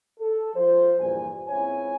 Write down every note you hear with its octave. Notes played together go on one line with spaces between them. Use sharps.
A4
F3 F4 C5
E2 G2 A#2 G#5
C#2 C4 E4 C#5 G#5